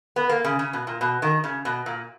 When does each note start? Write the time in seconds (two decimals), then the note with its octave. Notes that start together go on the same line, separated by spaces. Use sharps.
0.16 B3
0.29 A#3
0.44 C#3
0.59 C#3
0.73 B2
0.87 A#2
1.01 B2
1.22 D#3
1.44 C#3
1.65 B2
1.86 A#2